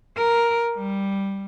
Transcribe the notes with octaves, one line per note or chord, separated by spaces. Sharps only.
A#4
G3